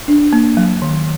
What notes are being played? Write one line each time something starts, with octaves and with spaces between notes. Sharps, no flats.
D4
A#3
F#3
D#3